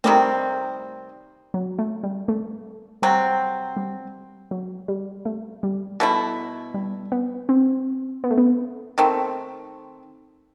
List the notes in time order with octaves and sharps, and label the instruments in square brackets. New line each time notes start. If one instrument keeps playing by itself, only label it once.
[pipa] C3 D#3 G3 C4 [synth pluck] A3
[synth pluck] F#3
A3
G3
A3
[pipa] C3 F#3 C4 [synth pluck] G3
[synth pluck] G3
F#3
G3
A3
G3
[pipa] B2 A3 E4
[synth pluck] G3
B3
C4
B3
A3
B3
[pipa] D#3 A3 C4